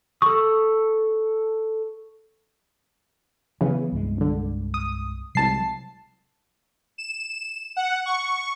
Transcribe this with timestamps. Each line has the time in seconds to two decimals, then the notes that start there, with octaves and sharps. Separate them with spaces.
0.22 A4 C#6 D#6
3.61 C#3 E3 F#3 B3
3.92 C2 G2 G#3
4.17 G1 D3
4.74 D#6
5.35 C2 C3 F#3 G#3 A5 C7
6.98 E7
7.77 F#5
8.06 C#6